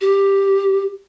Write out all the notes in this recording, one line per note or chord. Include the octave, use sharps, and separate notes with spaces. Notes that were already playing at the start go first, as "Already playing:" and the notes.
G4